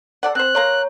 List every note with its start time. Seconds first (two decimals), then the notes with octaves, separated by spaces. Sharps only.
0.23 A4 D5 F#5
0.35 C4 C5 F#6
0.55 A#3 C#5 A#5 C6